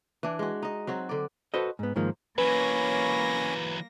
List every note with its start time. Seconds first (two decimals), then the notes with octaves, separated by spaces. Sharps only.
0.23 E3 D4
0.39 G#3 F#4
0.62 D#4 D#5
0.87 F#3 C4 F#4
1.09 D3 D5
1.54 F#4 A4 B4 C5 D#5
1.79 G#2 B3
1.96 G#2 D#3 F3 A#3
2.38 E3 F#3 A#3 C#4 B4 C#5 B5 A#6